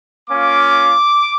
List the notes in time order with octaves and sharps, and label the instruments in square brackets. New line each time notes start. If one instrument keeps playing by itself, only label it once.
[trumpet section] A#3 C#4 F4 D6